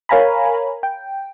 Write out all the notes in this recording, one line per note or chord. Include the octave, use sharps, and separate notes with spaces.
A#4 C#5 F5 G#5 A#5 B5
G5